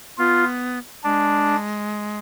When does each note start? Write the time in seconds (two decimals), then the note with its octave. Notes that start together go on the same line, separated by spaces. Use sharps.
0.18 B3 F4
1.04 G#3 D4